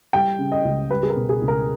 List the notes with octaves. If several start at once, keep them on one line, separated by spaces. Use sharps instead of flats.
G3 G5
C#3
D#5
C#2
G3 B4
G#4
A#4
B2
G#4
C#2
A#4